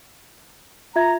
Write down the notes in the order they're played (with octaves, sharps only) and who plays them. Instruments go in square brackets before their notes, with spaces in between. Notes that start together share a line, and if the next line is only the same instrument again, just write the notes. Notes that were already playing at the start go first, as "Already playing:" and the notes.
[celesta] F4 E5 G#6 [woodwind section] A#5